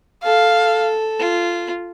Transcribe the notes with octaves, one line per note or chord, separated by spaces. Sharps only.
A4 F5
F4